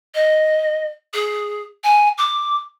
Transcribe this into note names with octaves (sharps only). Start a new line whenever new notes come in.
D#5
G#4
G#5
D6